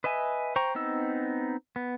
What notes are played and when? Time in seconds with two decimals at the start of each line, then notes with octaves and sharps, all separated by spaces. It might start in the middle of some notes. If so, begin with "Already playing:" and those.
0.04 B4 D#5 E5 G#5
0.56 C5 G5 A#5 C#6
0.75 B3 C4 D#4 E6
1.76 B3